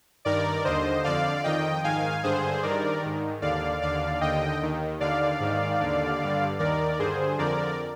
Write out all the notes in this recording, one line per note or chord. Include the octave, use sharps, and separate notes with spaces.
G2 D#3 A#4 D5
D#2 D3 C5 D#5
F2 D3 D5 F5
F2 D#3 D#5 G5
G#2 D#3 F5 G#5
G2 D3 G#4 C5
G2 D#3 A#4 D5
G#2 D#3
D#2 D3 D5 F5
D#2 D3 D5 F5
D#2 D3 D#5 G5
D#2 D#3
D#2 D3 D5 F5
G#2 D#3
D#2 D3
G2 D3
D#2 D#3 A#4 D5
G2 D3 G#4 C5
F2 D3 A#4 D5